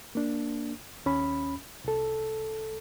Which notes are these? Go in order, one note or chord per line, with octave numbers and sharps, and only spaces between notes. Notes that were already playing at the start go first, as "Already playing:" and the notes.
A#3 D4
D#2 C#4 B5
C2 A4